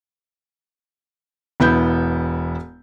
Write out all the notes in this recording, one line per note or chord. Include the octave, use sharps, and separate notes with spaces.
E1 B3 E4 B5 G6